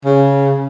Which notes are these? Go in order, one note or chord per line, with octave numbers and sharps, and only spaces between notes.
C#3